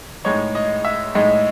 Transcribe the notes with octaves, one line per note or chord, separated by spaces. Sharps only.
A2 G#3 D#4 C#5
D#5
E5
A2 G#3 D#4 D#5